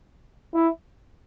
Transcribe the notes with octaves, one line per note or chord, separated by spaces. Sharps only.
E4